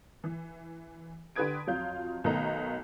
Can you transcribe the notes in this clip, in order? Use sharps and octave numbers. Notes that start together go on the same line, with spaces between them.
E3
D3 G4 B4 D#6 G#6 D7
F2 F#3 F4 F5 G6
B1 D#3 A3 B3 D#5 A#5